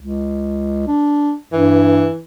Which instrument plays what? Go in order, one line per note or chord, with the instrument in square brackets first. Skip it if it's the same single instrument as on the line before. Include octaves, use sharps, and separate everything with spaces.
[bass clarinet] C#2
D4
[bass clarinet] G2 [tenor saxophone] E3